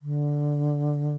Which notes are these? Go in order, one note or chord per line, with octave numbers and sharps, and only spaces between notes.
D3